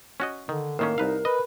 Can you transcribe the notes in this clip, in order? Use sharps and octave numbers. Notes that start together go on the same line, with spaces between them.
C#4 F#4 D#5
D3 D#3
A2 D#3 A#3 C#4 A#4
C2 D#4 B4 F5
B4 D#5